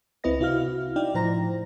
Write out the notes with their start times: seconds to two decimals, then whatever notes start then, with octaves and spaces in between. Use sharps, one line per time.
0.24 C#2 C4 E4 B4 D#5 A#6
0.40 C3 E4 F#4 F5 F6
0.96 D#4 E4 D5 G5
1.14 A2 F3 C5 A#5 A#6